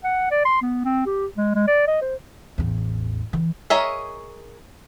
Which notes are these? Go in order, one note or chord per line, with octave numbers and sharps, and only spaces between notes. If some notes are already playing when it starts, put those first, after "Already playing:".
F#5
D5
C6
B3
C4
G4
G#3
G#3
D5
D#5
C5
A1 E2
E3
G#4 A#4 C#5 D#5 E5